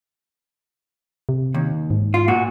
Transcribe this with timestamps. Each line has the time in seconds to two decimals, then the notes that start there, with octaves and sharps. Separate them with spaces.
1.29 C3
1.54 D#2
1.90 G#2
2.14 F4
2.28 A#2 F#4